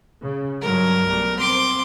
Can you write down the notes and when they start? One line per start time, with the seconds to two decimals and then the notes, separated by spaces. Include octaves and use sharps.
0.23 C#3
0.62 G2 F#3 G#3 A#4
1.05 B1 G3 A3
1.40 C4 C6 D6